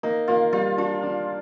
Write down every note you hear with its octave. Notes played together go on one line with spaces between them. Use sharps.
A#3 D#4
A#3 F4
G3 F4
D4 F4
D4